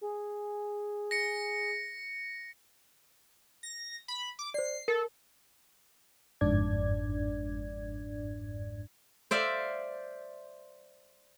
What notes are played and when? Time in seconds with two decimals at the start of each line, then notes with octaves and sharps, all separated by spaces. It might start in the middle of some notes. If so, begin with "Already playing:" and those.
0.01 G#4
1.11 A#6 C#7
3.63 A#6
4.08 B5
4.39 D6
4.54 C5 D5 C7
4.88 A4 A#4
6.41 G1 F2 G#2 D4 D5 G#6
9.31 C5 D5 E5 F5